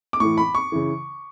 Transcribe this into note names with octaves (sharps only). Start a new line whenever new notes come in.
D6
A2 E3 C#6
B5
C#6
C#3 E3